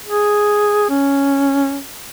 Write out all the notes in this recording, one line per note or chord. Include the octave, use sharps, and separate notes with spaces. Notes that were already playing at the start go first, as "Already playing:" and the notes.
G#4
C#4